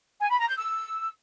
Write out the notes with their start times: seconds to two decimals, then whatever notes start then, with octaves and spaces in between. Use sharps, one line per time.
0.20 G#5
0.29 B5
0.39 A#5
0.48 G6
0.57 E6